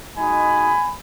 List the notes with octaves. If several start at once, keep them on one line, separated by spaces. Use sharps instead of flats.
G#3 D#4 F#4 G#5 B5